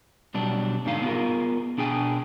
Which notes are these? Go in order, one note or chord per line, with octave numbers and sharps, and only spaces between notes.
B2 F#3 G3 D4
G#2 D3 D#4 F5
B3 F4 G4 G#4 A#4
B2 D4 G#4 G5 G#5